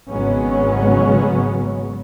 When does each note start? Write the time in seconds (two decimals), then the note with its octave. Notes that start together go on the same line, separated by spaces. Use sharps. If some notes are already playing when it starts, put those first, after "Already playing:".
0.11 G#1 C#3 F#3 G#3 B3 C#4